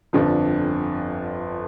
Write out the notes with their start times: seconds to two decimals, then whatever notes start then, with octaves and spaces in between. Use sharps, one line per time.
0.13 G1 F2 D3 F3